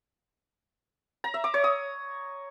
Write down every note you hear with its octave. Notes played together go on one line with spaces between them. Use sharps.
A#5
E5
D6
C#5
D#6